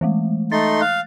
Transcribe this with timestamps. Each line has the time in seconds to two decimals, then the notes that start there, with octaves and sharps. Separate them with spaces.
0.01 E3 G#3 A3
0.52 A3 D#4 C6 A6
0.81 F5 F#6